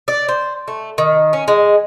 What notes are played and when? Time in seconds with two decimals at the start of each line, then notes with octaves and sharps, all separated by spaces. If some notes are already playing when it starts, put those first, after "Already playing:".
0.08 D5
0.28 C5
0.68 A3
0.98 D#3
1.33 C#4
1.48 G#3